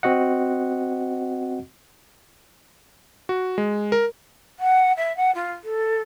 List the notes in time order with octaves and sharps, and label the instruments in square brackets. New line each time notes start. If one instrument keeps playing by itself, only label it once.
[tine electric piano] C4 F#4 D#5 F#5
[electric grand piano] F#4
G#3
A#4
[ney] F#5
E5
F#5
F4
A4